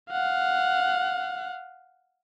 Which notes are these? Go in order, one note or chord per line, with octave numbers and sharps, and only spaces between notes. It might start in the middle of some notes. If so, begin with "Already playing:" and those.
F5 F#5